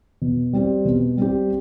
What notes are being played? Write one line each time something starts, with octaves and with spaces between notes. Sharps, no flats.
B2
G3 C4 G4
B2
G3 C4 G4